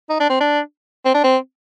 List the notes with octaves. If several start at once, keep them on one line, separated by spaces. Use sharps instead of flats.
D#4
D4
C4
D4
C4
D4
C4